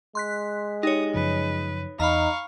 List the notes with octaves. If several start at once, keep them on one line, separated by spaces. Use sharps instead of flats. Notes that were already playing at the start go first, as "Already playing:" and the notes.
G#3 C6 F#6 B6
D#4 G4 C#5 D#6
F#2 C#3 F3 B4
E2 D#4 F5 A#5 B5 C#6